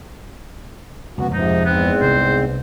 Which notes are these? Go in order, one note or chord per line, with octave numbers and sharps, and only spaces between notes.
F1 C#2 B3 F#4
F2 G#2 C3 F3 G#3 D#4
E2 G#2 B3 C4
C2 C#3 C5